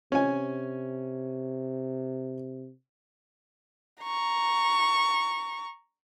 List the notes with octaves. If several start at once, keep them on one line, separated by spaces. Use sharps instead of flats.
C3 C#4 G#5
A#5 C#6